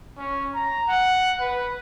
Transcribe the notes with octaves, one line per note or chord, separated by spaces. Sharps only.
C#4
A#5
F#5
B4